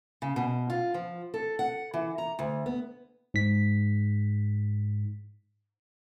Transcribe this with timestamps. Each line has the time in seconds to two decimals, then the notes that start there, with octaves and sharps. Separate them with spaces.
0.22 C#3
0.36 B2
0.70 F4
0.94 F3
1.34 A4
1.59 F#5
1.94 E3
2.18 A#5
2.39 D2
2.66 B3
3.34 G#2 B6